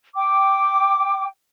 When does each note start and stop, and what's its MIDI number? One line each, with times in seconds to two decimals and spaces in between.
0.15 1.25 79
0.15 1.25 86